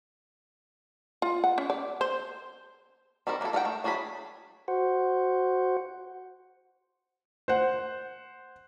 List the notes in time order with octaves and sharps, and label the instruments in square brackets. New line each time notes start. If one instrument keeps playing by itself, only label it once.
[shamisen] F4
F#5
C#4
D5
C5
[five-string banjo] D#3 G3 C4 A#4
A#3 B3 D4 E4 A4
D#4 A4 A#4 F#5 G5
A3
F#3 D4 G#4 A#5 B5
[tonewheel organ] F#4 C5 F#5
[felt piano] C5 F#5